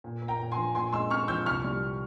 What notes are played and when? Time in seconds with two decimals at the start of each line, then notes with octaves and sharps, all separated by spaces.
0.04 A#2
0.22 A#3
0.28 G5 A#5
0.39 A#2
0.52 G#5 C6
0.57 F3
0.75 A#2 G#5 C6
0.92 G#3 C6 E6
1.10 C4 C#6 F6
1.28 F3 E6 G6
1.46 C2 C#6 F6
1.64 G3